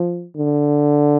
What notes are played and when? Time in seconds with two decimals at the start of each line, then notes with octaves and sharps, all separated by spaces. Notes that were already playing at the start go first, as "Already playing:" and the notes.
Already playing: F3
0.37 D3